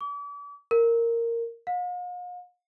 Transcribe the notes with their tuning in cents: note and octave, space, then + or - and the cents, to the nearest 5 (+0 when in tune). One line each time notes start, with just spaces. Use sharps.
D6 -40
A#4 -10
F5 +45